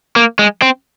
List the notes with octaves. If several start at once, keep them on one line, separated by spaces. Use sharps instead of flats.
A#3
G#3
C4